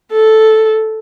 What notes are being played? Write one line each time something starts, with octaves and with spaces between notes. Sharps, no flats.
A4